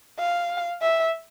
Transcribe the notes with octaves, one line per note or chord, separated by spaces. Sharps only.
F5
E5